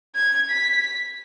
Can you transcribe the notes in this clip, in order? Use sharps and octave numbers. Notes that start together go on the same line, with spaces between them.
G#6
B6